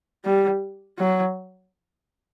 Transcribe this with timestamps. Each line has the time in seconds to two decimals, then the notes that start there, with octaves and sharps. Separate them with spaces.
0.25 G3
0.99 F#3